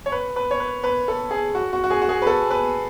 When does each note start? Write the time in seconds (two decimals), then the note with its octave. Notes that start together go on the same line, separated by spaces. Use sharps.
0.06 C#5
0.12 B4
0.36 B4
0.51 C#5
0.60 B4
0.84 B4
1.08 A4
1.31 G#4
1.55 F#4
1.73 F#4
1.84 F#4
1.90 G#4
2.02 F#4
2.09 G#4
2.22 B4
2.27 A4
2.50 B4